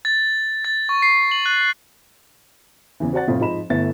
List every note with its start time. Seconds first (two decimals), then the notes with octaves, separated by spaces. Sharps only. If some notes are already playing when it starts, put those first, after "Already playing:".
0.05 A6
0.65 A6
0.89 C#6
1.02 C7
1.31 F#7
1.46 F#6
3.00 E2 C#3 E3
3.13 C4 F#4 D5 F#5 A6
3.28 F1 F2 A2 C4 F4
3.40 G#2 F3 D#5 B5 E7
3.70 G1 A3 B3 E4 A6